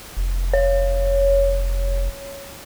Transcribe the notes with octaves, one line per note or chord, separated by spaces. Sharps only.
F1
C#5